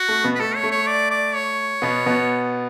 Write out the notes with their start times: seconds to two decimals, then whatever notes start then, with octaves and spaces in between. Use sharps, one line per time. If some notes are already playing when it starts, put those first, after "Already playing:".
Already playing: F#4
0.08 A3
0.24 B2 B3
0.35 B4
0.39 A3 A4
0.56 C#5
0.63 A3
0.71 C#5
0.87 D5
1.11 D5
1.35 C#5
1.82 B2 B3
2.06 B2 B3